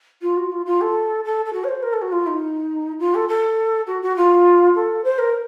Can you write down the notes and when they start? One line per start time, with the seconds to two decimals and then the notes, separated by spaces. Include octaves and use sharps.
0.21 F4
0.36 F#4
0.52 F4
0.66 F4
0.81 A4
1.24 A4
1.45 A4
1.53 F#4
1.64 C#5
1.68 C5
1.82 A#4
1.93 A4
2.01 F#4
2.12 F4
2.26 D#4
2.99 F4
3.14 A4
3.28 A4
3.87 F#4
4.02 F#4
4.16 F4
4.75 A4
5.04 C5
5.18 A#4